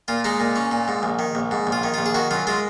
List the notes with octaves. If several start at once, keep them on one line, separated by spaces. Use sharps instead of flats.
A#2 F4
G#3 D#4
A#2
C#4
A#2
G#2
A#1
D#3
A#1
G#2
A#1
F4
D#3
A#1 F4
G#4
D#3 F#4
F#2 F4
G#3 F4